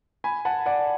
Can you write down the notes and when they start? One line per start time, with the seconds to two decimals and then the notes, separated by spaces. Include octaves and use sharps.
0.24 G#5 B5
0.45 F#5 A5
0.66 D5 F#5